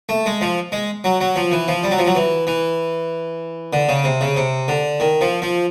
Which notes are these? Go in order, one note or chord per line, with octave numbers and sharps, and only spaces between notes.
A3
G#3
F3
G#3
F#3
F#3
F3
E3
F3
G3
F#3
F3
F#3
E3
E3
D3
C#3
C3
C#3
C3
D3
D#3
F3
F3